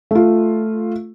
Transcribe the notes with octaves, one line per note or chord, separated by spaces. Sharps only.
A3 F4